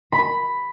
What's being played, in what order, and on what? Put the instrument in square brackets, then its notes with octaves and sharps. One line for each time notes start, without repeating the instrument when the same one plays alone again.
[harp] B5